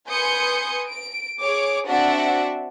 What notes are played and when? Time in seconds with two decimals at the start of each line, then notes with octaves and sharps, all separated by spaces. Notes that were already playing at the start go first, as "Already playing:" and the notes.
0.10 B4 G#5 C6 D#6 G6 C#7
0.89 D7
1.43 G#4 C#5 D6
1.88 C4 D4 F#4 D5 E5 F#5